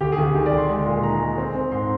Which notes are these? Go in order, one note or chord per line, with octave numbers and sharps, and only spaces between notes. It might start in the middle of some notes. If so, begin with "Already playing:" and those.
D2 G4
G#4
D2 G4
D#3 G4
D5
D2 C6
G#3 C6
A#2
D#4 A#5
G#3
C4
C4
G#2 C6